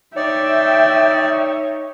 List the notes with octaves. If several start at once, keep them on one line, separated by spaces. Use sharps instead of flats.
D#4 C#5 D5 E5 G5